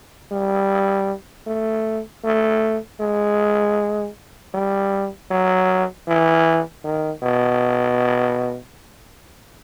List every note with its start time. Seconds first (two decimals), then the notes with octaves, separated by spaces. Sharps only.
0.32 G3
1.47 A3
2.24 A3
3.01 G#3
4.54 G3
5.31 F#3
6.08 E3
6.84 D#3
7.23 B2